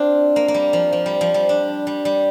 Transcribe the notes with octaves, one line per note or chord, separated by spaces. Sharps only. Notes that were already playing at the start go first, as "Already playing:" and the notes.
Already playing: C4 D4 F4
A#3
A#3
G3
F3
F3
G3
F3
G3
D4
G3
G3